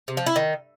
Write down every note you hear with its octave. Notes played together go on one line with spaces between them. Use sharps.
C3
F3
E4
D#3